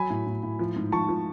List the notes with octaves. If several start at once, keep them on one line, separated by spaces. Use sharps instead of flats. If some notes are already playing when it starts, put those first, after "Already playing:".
Already playing: F#3 G#5 B5
A2
A2
A2
F3
G#2
F3 A5 C#6
F3